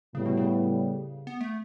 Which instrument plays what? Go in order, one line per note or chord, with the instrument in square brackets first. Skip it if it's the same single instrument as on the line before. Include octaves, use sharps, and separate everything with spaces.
[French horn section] A2 G3 B3 [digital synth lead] C#3
[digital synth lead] B2
C#3
B3
A3